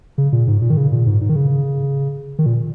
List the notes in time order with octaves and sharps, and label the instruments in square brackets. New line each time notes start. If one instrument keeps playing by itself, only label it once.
[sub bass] C#3
A#2
G#2
A#2
D#3
C#3
A#2
G#2
G#2
D#3
C#3
D#3
A#2